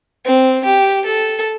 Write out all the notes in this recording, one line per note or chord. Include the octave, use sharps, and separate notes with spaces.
C4
G4
A4